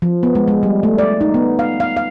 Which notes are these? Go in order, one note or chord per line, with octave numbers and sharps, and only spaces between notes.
F3
B3
G#3
G#3
G3
A3
D5
D#4
B3
F5
F5
F5